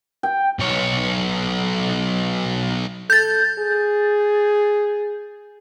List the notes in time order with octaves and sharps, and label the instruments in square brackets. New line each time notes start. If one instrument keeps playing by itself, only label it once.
[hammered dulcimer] G5
[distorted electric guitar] B1 C#5
[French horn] A4 [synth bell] G6 A6
[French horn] G#4